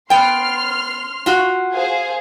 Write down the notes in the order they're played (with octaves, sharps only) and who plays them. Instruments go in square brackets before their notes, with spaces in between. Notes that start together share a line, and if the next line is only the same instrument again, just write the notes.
[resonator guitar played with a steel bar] B3 G5 [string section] C6 F6
[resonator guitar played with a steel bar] F4 F#4
[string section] G#4 C5 F5